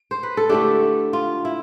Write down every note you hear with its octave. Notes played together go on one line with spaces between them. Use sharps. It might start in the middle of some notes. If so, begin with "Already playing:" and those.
Already playing: D5
C5
B4
A4
D3 A3 D4 E4 G4
F4
E4